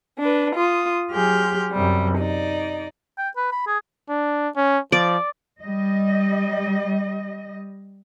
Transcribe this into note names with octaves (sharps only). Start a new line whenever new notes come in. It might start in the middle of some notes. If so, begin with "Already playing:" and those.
D4 B4
F4 D#6
F#3 G4 G#4 C6 F6 G6
F#2 C3 G3
D#4 D5
G5
B4
B5
G#4
D4
C#4
F3 D5
G3 D#5